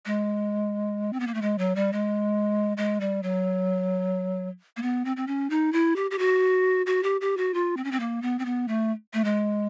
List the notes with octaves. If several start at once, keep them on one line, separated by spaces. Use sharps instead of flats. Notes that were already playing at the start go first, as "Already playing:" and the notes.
G#3
C4
B3
A#3
A3
G#3
F#3
G3
G#3
G#3
G3
F#3
A#3
B3
C4
C4
C#4
D#4
E4
G4
G4
F#4
F#4
G4
G4
F#4
F4
C4
C#4
C4
A#3
B3
C4
B3
A3
A3
G#3